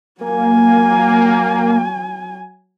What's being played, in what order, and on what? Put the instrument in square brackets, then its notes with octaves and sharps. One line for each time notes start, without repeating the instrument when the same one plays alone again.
[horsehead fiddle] F#3 G#5 [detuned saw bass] A#3